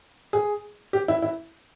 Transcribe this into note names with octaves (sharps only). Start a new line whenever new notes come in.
G#4
G4
E4
E4